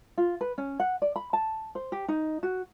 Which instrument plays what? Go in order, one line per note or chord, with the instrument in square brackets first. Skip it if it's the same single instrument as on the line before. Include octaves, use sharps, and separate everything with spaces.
[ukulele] F4
B4
C#4
F#5
D5
B5
A5
C5
G4
D#4
F#4